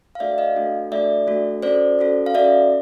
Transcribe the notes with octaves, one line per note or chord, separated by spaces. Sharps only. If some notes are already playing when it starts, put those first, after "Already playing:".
F5
A3 D4 F#4 A4 D5 E5
D#5 F5
A3 D4 F#4 A4
A3 D4 F#4 A4 D5 E5
A3 D4 F#4 A4
C#4 F#4 A4 C5 D5
C#4 F#4 A4
F5
C#4 F#4 A4 D5 E5